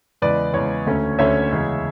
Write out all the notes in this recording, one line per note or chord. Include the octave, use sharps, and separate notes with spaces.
E2 C#3 G#3 B4 D5
E2 C#3 G#3 C#5
D2 D3 A3 C#4
D2 D3 A3 C#4 C#5 E5
E2 C#3 G#3